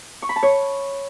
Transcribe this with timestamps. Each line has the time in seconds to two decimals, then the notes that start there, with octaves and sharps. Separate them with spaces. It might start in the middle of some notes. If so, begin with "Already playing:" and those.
0.22 C#6
0.29 B5
0.36 A5
0.43 C#5